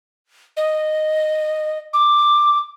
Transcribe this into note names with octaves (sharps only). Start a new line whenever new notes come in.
D#5
D6